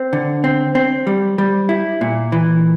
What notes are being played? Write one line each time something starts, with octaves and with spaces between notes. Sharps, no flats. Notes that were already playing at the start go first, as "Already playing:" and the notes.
Already playing: C4
D3
C4
C4
G3
G3
E4
A#2
E3